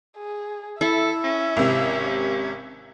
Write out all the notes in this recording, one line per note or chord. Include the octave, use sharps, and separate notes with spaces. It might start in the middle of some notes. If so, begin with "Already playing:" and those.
G#4
E4 A4 E5
C#4
G#1 C3